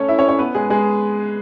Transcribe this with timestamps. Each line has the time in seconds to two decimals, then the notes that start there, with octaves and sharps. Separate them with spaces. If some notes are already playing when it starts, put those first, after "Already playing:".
Already playing: A3 C#4 A4 C#5
0.08 E4 E5
0.18 C#4 C#5
0.28 C#4 C#5
0.39 B3 B4
0.55 G#3 G#4
0.70 G#3 G#4